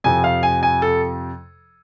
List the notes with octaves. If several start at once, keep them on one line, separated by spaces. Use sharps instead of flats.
F2 C3 F3 G#5
F5
G#5
G#5
A4